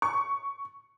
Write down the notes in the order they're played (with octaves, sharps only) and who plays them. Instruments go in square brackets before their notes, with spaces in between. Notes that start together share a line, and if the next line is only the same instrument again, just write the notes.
[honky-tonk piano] C#6